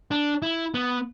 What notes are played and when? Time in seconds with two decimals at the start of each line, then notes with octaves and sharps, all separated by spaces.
0.11 D4
0.42 E4
0.74 B3